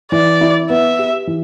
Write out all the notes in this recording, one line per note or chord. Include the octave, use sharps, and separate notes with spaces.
E3 D5
E4
B3 E5
G4
E3